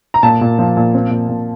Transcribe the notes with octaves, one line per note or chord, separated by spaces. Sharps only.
A#5
A#2 A5
A#2
F3
A#2
C4
A#2
A#2